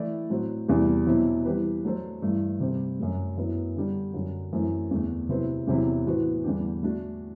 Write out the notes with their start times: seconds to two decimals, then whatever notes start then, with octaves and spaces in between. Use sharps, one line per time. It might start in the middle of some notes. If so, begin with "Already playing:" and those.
Already playing: E3 A3 E4 A4 D5
0.30 A2 F#3 C4 F#4
0.68 E2 C3 E3 G3 D4
1.07 B2 F#3 C4 E4 G4
1.45 E3 G3 C4 G4 B4
1.84 F#3 A3 D4 A4 C5
2.22 G2 E3 A3
2.60 C3 G3 C4 G4
2.99 F#2 F#3 A3
3.37 F#2 F#3 B3 E4 B4
3.76 D3 G3 D4
4.14 F#2 D3 F#3
4.52 F#2 E3 A3 C4
4.91 E2 D3 A3
5.29 C3 F#3 C4 E4 B4
5.67 E2 C3 F#3 C4 E4
6.06 A2 E3 B3 F#4 C5
6.44 E2 D3 G3 D4 G4
6.83 A3 D4 F#4